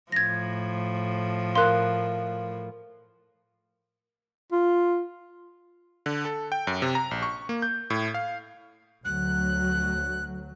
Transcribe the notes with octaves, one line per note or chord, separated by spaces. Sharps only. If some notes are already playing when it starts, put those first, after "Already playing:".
A2 F3 G#6 A#6
A#4 F5 C6 F#6
F4
D3
A4
G5
F#2
C3
A#5
A#1
C#6
A#3
G6
A2
F5
D2 F#3 F#6